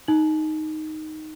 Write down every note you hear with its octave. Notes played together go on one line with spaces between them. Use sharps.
D#4 F#7